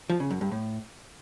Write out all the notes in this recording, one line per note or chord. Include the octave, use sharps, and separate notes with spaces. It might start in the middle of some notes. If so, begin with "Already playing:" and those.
F3
C#3
F#2
G2
A2